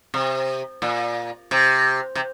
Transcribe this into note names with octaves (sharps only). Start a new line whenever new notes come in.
C3
A#2
C3
C3